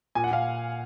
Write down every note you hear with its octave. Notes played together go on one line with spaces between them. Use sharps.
A#2 G#5
F#5
A#2 F5